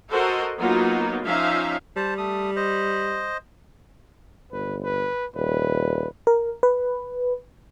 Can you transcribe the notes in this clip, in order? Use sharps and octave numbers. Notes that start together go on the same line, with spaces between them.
F#4 A4 A#4 C5 D#5
F#3 A#3 B3 D#4 F4 F#4
F3 C#4 D#4 E5 F5
G3 C5 A5
A3 D#6
C5 D#5
G1 B4
B4
D#1 B4
A#4
B4